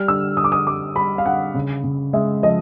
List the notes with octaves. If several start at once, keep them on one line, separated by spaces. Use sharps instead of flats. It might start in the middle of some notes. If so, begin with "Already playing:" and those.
Already playing: G3 F6
D3 E6
D3 D#6
D6
D#6
G3 D6
G3 B5
F5
D3 F#5
C#3
C#3
G#3 E5
F3 D#5